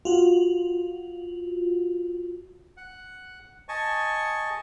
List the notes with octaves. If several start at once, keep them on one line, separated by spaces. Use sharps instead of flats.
F4 F#4
F#5
D#5 G#5 A5 C#6